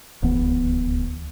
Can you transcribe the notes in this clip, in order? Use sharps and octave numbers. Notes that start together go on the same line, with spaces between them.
D1 C#2 E3 B3